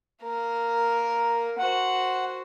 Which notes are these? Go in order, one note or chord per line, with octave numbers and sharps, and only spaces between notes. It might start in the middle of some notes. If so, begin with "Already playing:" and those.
A#3 A#4
F#4 C5 F#5